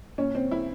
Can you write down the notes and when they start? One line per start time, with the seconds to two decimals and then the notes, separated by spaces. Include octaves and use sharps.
0.18 A#2 C#4
0.35 C4
0.51 E4